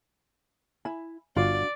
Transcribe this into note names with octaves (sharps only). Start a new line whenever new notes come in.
E4 G#5 B5
G1 D4 F4 F#4 D5 F5